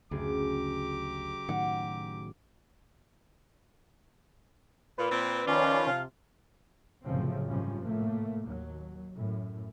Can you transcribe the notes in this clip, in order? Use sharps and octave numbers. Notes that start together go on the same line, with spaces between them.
F#1 D2 G4 G#4 A#5 D6
A2 D#3 F#3 F#5
A#2 B4
A#2 C4
D#3 F3 C#4 F4 D5
C3 F5
F1 F#2 A2 C#3 F3 C4
G#1 G#2 C3 F3 G3 C#4
A2 A3 A#3
D#2 F#3
F#2 A2